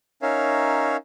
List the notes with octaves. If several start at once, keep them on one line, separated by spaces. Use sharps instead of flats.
C#4 D#4 A#4 C#5 E5 F5